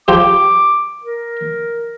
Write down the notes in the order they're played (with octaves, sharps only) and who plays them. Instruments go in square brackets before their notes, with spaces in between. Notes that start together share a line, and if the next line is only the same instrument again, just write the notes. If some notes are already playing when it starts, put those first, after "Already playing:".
[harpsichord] F3 G4 C5 [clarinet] D6
[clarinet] A#4